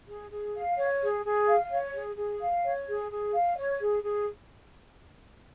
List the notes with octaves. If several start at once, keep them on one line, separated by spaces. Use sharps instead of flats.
G#4
G#4
F5
C#5
G#4
G#4
F5
C#5
G#4
G#4
F5
C#5
G#4
G#4
F5
C#5
G#4
G#4